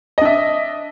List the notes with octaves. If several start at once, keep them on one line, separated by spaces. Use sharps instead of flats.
D4 D#5 E5